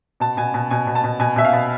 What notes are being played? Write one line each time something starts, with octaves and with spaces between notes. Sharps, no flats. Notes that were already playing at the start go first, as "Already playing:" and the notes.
B2 A5
B2 G#5
B2
B2 G#5
B2
A5
B2
B2 G#5
B2 E5
F5
B2